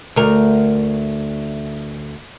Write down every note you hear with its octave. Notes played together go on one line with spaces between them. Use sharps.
D2 A#4